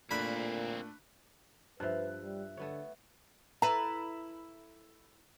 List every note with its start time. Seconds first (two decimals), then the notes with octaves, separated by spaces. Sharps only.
0.11 A#2 A3 A#3 C4 D4 B5 F#6
1.80 G2 F3 B4 E5 F#6
2.22 G3
2.57 D3 A3 B3 C#5
3.62 E4 A4 B4 A#5